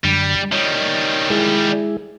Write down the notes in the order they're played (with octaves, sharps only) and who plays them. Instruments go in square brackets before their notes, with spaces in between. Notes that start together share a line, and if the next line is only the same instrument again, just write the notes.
[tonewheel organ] F#2 D3 [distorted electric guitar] G3
[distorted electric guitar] D#3 G3 [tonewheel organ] C#5
[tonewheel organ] G#3 E4 G#4